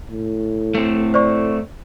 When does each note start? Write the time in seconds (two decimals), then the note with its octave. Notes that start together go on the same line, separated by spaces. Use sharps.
0.11 A2
0.75 A3 C4
1.14 C5 D5 C#6